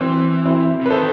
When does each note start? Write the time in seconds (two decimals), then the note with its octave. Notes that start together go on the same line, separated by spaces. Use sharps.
0.01 E3 C4
0.45 C4 E4
0.81 C3
0.86 B4
0.90 D#3 A4 C5